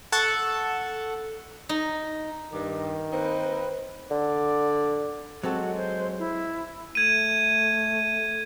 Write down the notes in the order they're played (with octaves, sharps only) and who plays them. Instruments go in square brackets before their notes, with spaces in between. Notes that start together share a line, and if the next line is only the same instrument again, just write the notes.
[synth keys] A4 F#5 A5 C#6
[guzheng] D#4
[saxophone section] G2 [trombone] D#3 [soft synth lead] D6
[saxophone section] A#3 C4 D#4 [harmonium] B4 [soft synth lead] C5
[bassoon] D3 [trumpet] D5
[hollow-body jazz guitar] F#3 C4 A4 [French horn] G#3 [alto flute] F#4
[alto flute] C5
E4
[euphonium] A3 [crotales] G#6 D#7